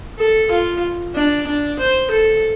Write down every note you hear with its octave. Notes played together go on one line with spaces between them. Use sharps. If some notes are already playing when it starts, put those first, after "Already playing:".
A4
F4
D4
D4
C5
A4